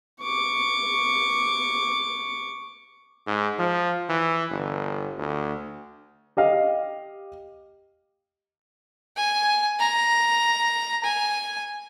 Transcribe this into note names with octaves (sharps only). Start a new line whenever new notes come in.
C#6 D6
G#2
F3
E3
G1
D2
G4 D#5 F5
G#5
A#5
G#5